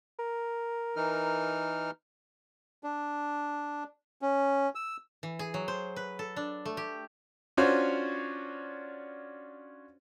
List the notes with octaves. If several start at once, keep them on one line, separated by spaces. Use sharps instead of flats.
A#4
E3 D#4 F6
D4
C#4
E6
E3
G#4
F#3
C5
B4
A4
D4
A3
G4
C#4 D4 F4 F#4 C5 C#5